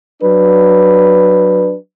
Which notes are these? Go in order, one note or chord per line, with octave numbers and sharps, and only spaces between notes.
F#3 D4 B4